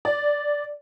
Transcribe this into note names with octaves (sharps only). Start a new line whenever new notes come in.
D5